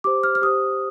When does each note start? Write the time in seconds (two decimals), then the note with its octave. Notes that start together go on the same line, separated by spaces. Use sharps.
0.04 G4 C5 D6
0.23 F6
0.35 F6
0.42 G4 D#6
0.46 C5